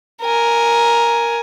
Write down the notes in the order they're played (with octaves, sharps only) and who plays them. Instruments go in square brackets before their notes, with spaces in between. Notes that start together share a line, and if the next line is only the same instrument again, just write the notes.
[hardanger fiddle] A#4 G#5